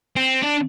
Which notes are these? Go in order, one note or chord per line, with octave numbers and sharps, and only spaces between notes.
C4
D4